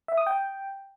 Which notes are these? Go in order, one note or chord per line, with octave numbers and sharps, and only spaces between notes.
E5
D#6
G5